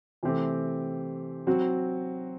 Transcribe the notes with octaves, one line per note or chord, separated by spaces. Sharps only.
C3 E3 A3 C4 G4
F#3 C4 F#4